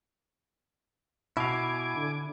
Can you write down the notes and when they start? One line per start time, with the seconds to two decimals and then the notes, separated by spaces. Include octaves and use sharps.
1.37 B2 E4 F5 G#5 D6
1.96 D3